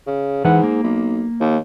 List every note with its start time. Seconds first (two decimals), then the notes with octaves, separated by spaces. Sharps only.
0.07 C#3
0.44 G#2 E3 B4 F#5
0.64 A#3
0.83 B1
1.40 D#2